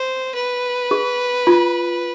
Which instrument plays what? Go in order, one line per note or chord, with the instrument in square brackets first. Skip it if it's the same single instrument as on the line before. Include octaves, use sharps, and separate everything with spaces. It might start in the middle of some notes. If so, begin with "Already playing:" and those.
Already playing: [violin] C5
B4
[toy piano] G#4
F4